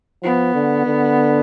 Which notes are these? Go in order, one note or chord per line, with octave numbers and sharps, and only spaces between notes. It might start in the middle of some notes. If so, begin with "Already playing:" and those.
F3 B3
D3
D3